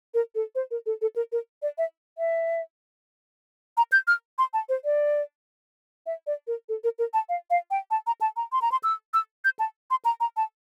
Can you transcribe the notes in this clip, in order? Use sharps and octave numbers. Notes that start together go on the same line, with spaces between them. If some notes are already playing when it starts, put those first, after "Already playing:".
A#4
A4
C5
A#4
A4
A4
A#4
A#4
D5
E5
E5
A#5
G6
F6
C6
A5
C5
D5
E5
D5
A#4
A4
A#4
A#4
A5
F5
F5
G5
A5
A#5
A5
A#5
C6
A#5
C6
E6
E6
G6
A5
C6
A#5
A#5
A5